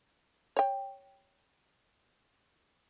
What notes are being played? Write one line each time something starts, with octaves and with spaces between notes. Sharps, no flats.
C#5 G5